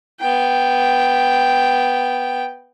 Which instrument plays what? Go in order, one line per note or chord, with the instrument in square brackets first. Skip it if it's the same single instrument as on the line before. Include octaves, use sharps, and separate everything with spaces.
[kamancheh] B3 G5